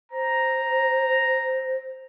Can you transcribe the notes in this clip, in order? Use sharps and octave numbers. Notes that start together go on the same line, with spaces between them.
C5 A#5